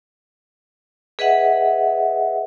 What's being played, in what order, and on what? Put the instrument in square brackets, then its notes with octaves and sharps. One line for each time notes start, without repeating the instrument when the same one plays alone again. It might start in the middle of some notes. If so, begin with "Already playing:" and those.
[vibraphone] G#4 B4 D#5 E5 F#5